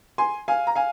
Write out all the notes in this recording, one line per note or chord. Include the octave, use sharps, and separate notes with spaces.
G#5 C6
F5 G#5
A#5
F5 G#5